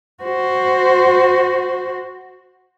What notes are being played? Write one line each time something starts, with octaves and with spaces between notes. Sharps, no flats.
F#4 C5